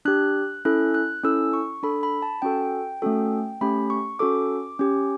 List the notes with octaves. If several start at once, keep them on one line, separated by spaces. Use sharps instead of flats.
D4 G4 F#6
C#4 E4 A4 F#6
F#6
C#4 E4 A4 E6
C#6
D4 A4 B5
B5
A5
C#4 F#4 A4 G5
A3 C#4 F#4 A4
A3 C#4 G4 B5
C#6
C#4 F#4 A4 D6
C#4 G4